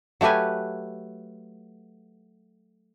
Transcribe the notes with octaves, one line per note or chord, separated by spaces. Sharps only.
F#3 A3 G4 B4 G#5